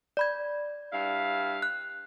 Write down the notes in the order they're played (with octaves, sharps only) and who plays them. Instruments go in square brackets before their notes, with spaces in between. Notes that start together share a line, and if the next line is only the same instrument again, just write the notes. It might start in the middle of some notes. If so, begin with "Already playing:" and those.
[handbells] D5 B5 G#6
[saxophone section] G2 E4 F5
[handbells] F#6